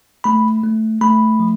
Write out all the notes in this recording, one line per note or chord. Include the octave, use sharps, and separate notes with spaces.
A3 B5
A3
A3 B5
F3